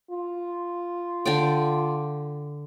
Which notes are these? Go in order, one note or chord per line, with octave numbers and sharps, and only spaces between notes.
F4
D3 D5 G5